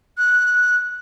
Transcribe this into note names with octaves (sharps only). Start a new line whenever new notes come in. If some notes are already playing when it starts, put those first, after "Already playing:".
F#6